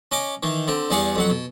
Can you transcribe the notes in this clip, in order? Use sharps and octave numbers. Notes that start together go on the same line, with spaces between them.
C#4 D#5 D6
D#3 E3
D3 C4
E2 G3 G#4 F5 F#5
F2 F#3 F#5
B2